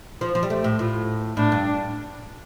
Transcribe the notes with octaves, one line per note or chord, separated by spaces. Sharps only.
F3
F3
G3
A3 G4
A2
A2 F4
A2 D4
G2